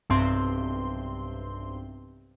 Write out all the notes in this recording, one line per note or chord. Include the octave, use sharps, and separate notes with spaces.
B1 G2 C3 C4 C6